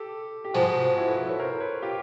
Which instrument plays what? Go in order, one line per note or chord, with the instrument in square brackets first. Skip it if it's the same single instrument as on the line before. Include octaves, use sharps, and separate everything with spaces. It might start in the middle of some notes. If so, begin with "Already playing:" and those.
Already playing: [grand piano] G4 A4
G4
[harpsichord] G#2 F3 G#3 [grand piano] F#4 G#4
[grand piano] E4 F#4
A4 B4
A4 B4
B4 C#5
A#4 C5
B4 C#5
F4 G4